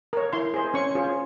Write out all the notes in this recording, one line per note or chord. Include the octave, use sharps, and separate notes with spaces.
A#4 C#5
E4 C6
G#4 C5
C#4 C#6
F4 G#4 C5